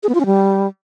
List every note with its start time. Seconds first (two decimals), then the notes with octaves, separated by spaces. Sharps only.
0.03 G#4
0.09 B3
0.15 F4
0.20 C#4
0.26 G3